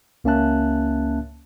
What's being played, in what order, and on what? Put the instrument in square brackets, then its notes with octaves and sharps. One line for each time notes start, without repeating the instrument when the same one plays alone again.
[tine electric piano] C#2 A#3 C#4 E5 A5 F#6